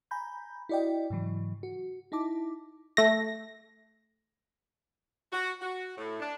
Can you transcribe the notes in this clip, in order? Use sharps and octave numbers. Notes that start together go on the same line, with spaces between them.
G#5 A#5 B5 G6
E4 F#4 D5 D#5 G5
G#2 C#3 E3 F#3
F#4
D#4 E4 A5 D6
A3 A#6
F#4
F#4
A2
D4